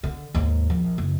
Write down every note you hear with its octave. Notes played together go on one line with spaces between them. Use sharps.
D3
D#2 G#2
A#1
F#1